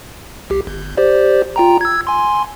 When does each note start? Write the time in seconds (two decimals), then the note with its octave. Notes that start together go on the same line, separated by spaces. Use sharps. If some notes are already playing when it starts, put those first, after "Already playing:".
0.50 C2 G4
0.67 G1
0.97 G4 C5 D5
1.56 F4 G5 A#5
1.81 E6 G#6
2.07 G#5 C6